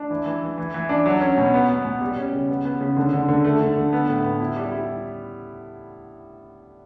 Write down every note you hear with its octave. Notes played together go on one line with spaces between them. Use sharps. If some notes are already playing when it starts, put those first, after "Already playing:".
Already playing: D4
E3
E3
E3
E3
E3
D4
F#3
C#4
B2
B3
B3
B2
G3
C#4
C#3
B3
B3
C#3
D3
D3
D3
A3
D3
D3
B3
A2
B3
E4
G3
E4